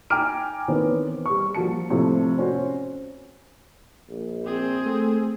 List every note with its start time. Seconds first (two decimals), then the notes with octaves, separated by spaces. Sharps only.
0.10 G5 G#5 A#5 D6 F6 D7
0.68 D#3 E3 B3 C4 C#5
1.26 G3 C#6
1.55 F3 G3 A#3 F#4 A5 C#7
1.90 A2 C3 F3
2.37 C4 C#4 F#4 C5
4.09 A#1
4.46 C4 G#4
4.85 A3